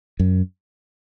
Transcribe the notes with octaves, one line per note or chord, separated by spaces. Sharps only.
F#2